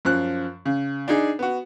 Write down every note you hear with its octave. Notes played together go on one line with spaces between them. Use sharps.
F#2 F3 F#6
C#3
D4 D#4 G#4
B3 F#4